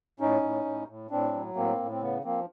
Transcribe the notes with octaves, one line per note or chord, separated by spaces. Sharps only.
A2 C#4 D#4
A2
A2
A2
A2 C4 D4
F#3
A2 A#3 C4
A2
C4
C#3 B3
F3 A#3 C4